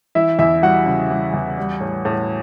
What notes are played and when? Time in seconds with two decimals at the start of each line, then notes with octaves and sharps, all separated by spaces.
0.15 E3 E4 E5
0.39 E2 E4 E5
0.62 G3 F#4 F#5
0.86 C#3
1.10 E3
1.34 E2
1.58 G3
1.81 A2
2.05 A2